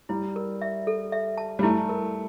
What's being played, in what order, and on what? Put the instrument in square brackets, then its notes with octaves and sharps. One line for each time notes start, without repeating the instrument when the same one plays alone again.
[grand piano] G3 [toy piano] E4
[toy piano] A#4
E5
A4
E5
A5
[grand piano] G3
[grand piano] A3 [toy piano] E4
[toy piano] A#4